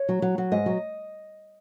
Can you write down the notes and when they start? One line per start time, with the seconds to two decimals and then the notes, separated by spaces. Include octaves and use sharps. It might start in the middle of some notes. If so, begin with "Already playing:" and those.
Already playing: C#5
0.09 F#3
0.22 F#3
0.38 F#3
0.52 G#2 D#5
0.66 F#3